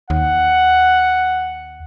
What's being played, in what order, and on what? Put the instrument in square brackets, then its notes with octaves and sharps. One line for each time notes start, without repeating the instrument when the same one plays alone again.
[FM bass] D#2 [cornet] F#5